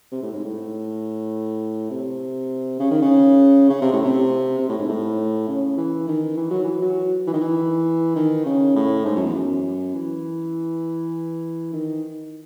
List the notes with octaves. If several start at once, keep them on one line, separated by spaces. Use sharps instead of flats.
C3
A2
G#2
A2
C3
C#3
D#3
C#3
C#3
C3
A2
C3
C3
A2
G#2
A2
C#3
E3
D#3
E3
F#3
E3
F#3
E3
D#3
E3
D#3
C#3
A2
G#2
F#2
E2
F#2
E3
D#3